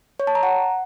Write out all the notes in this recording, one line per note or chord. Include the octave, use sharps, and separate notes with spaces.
C#5
A5
A#5
F#5